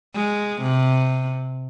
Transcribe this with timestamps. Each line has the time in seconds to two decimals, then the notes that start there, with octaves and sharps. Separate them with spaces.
0.15 G#3
0.62 C3